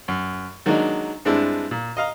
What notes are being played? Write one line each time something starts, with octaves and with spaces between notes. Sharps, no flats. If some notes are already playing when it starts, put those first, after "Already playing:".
F#2
D#3 F#3 G#3 A#3 D4 D#4
G2 G#3 C4 D4 E4
A#2
D#5 F5 A#5